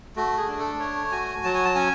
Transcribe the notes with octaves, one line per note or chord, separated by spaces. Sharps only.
A3 F#4
G#4
D4
A4
A3 C#5
F#4 G#5
F#3 A5
G#5
A5
C#4 G#5